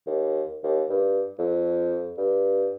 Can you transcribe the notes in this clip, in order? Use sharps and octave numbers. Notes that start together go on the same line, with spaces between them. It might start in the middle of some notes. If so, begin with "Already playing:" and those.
D#2
D#2
G2
F2
G2